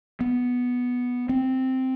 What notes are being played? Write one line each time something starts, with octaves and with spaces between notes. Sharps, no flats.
B3
C4